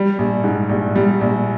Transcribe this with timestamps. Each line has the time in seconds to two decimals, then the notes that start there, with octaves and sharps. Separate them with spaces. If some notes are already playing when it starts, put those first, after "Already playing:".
Already playing: G3
0.19 A#1
0.44 G#2
0.70 A#1
0.95 G3
1.21 A#1